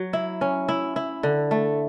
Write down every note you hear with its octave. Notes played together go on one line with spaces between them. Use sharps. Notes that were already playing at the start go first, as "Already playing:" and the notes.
Already playing: F#3
E4
C#4
E4
E4
D3
A3